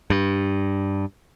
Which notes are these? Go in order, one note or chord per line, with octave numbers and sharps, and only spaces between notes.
G2